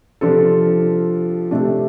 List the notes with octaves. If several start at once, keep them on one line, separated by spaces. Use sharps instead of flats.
C3 F3 D4 F4 A4
C3 A3 D4